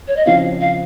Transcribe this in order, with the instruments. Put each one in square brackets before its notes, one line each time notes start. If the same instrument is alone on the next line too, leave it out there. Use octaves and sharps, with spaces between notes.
[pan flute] C#5
D#5
[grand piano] C#3 F3 C4 [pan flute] F5
[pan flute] F5